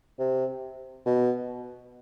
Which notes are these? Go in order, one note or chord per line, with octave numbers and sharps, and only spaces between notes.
C3
B2